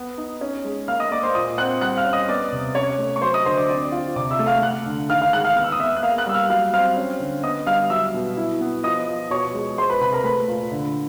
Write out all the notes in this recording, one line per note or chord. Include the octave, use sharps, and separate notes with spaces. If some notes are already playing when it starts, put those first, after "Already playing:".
Already playing: B3
D#4
C#4
G#3
A#3 F5 F6
D#5 D#6
A#3 D5 D6
C5 C6
A#2 D#5 D#6
C4 F#5 F#6
G3 F#5 F#6
F5 F6
C#4
D#5 D#6
B3 D5 D6
C3
C#4 C#5 C#6
A3
C#6
F#3 C5 C6
D#5 D#6
D3 C5 C6
D5 D6
C4 D5 D6
F4
C3 D5 D6
E5 E6
A3
F5 F6
A3 F#5 F#6
D3
D#3 F5 F6
F5 F6
G#3 F#5 F#6
F5 F6
B3 F6
E6
D#6
B3 E5 E6
F#6
A#3 F5 F6
F#5 F#6
G3 E6
F5 F6
F#3 F5 F6
C4 F5 F6
C#4
D3
B3 D#5 D#6
G3 F5 F6
F#3 E5 E6
B2
E4
B3
F3 D#5 D#6
F3
B2 C#5 C#6
G#3
G#3 C5 C6
B4 B5
C3 B4 B5
A#4 A#5
A3 B4 B5
A#2
D3